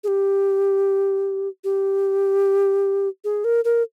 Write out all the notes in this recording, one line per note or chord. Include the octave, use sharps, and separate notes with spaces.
G#4
G4
G4
G#4
A#4
A#4